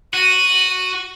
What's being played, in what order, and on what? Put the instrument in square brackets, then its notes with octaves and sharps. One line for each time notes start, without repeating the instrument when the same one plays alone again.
[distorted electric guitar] F#4 [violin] D#7